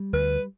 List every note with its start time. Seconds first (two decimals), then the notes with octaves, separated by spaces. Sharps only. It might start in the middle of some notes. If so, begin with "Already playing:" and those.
Already playing: G3
0.13 D2 B4